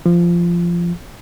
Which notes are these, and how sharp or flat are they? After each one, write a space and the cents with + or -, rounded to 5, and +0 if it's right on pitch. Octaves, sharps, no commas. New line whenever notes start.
F3 -15